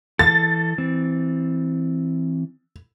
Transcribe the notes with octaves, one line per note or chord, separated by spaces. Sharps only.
E3 A4 A6
E3 C4